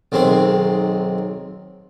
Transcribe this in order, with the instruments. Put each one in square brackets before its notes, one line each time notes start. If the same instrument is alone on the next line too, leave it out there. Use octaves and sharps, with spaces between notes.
[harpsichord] B1 D#3 G#3 C4 C6